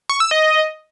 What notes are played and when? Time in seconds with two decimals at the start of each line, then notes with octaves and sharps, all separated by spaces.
0.09 C#6
0.20 E6
0.31 D#5